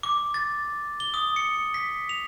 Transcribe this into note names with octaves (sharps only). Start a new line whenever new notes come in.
D6
A6
G7
D#6
C#7
B6
F7